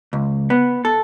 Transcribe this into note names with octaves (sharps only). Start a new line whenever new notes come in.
C#2
B3
A4